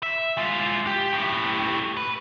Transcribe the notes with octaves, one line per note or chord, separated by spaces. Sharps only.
E5
G#3 F4
G4
A2 G4
B4